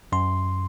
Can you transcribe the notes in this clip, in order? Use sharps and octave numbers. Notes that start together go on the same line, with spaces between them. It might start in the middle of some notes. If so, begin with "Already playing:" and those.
F#2 C6